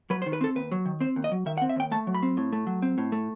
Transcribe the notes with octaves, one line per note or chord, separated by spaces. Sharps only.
F#3 B4
C5
D#3
B4
C4 A4
D#2 B4
F#3
D#3
C4 C5
D#2
D#5
F#3
D#3 E5
F#5
C4
E5
D#2 G5
A3 A5
F#3
B5
C4
A2
A3
F#3
C4
A2
A3